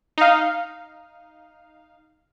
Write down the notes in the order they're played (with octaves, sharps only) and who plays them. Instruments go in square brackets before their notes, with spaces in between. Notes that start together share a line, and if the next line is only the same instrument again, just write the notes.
[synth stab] D#4 F5